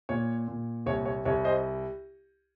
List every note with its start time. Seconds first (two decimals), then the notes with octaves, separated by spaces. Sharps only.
0.09 A#2 C#5
0.48 A#2
0.86 C2 C#5
1.05 C#5
1.25 C2 C#5
1.44 C5 D#5